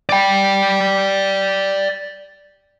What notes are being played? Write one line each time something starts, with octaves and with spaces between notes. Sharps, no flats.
D5 G5